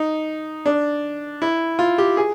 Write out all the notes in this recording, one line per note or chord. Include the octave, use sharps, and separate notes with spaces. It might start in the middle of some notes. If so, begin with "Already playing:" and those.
Already playing: D#4
D4
E4
F4
G4
G#4